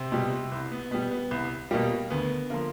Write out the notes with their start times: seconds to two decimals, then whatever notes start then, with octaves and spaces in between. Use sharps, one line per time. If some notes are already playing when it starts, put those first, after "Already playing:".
Already playing: C3 C4
0.12 B2 G3
0.52 C2
0.72 B3
0.91 B2 G3 B3
1.11 B3
1.31 C2
1.71 B2 G3 A#3
2.10 D2 B3
2.50 D3 F3 A#3